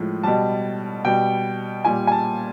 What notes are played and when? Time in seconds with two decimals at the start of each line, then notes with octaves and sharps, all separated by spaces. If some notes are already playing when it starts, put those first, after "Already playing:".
Already playing: A2 F3 G#3
0.23 B2 G3 A5
1.05 B2 G3 G5
1.85 A#2 G3 G#5
2.07 G#5
2.12 A5